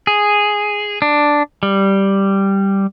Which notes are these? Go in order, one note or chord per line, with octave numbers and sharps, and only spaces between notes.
G#4
D4
G3